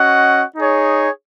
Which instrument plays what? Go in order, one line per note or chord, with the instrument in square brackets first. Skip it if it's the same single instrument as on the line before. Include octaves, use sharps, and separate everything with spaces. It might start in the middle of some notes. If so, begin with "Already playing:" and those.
Already playing: [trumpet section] C#4 F#4 D#5 F#5
D#4 G#4 C#5